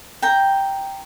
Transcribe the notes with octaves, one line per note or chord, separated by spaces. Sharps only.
G5 A#5